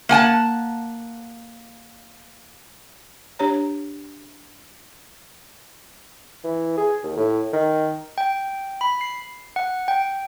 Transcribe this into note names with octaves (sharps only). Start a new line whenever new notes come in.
A#3 F#5 G#5 A5
D4 G4 C#5 A#5
E3
G#4
D#2
A2
D#3
G5
B5
C7
F#5
G5